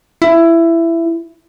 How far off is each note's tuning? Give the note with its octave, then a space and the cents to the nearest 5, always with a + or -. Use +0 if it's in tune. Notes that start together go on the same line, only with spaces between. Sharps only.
E4 +15